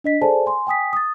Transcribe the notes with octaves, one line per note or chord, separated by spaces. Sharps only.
D4 D#5 B6
G#4 A4 C5 D5 G#5 A5
G#5 C6
G5 G#5 D#6 B6
D#6 A6